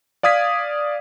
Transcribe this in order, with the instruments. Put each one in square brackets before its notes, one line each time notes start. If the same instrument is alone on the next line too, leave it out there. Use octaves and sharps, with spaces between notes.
[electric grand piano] D5 F5 D#6 G#6 B6